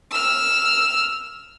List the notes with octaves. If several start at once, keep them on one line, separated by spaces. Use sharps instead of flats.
E6 F6